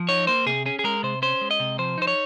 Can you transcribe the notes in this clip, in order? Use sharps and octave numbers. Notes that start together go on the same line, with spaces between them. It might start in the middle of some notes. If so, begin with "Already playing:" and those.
Already playing: F3
D#4 C#5
A#3 C5
C3 G#4
C#4 G#4
G#4
G#3 A#4
C3 C5
C#4 C5
G#3
D#5
C3
F3 C5
D#4 C5
C#5